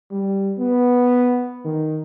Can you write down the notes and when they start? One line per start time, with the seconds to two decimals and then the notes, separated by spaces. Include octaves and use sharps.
0.11 G3
0.58 B3
1.64 D#3